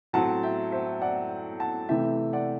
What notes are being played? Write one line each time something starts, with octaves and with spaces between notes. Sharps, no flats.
A2 F#3 C4 F#5 A5
E5 G5
C5 E5
D5 F#5
F#5 A5
C3 E3 A3 E4 E5 G5
D5 F#5